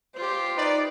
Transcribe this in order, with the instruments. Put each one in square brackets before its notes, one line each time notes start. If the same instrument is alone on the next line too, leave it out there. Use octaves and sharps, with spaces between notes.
[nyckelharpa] F4 G4 [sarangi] C5
[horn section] D#4 B4 D5